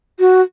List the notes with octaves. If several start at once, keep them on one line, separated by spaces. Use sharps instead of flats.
F#4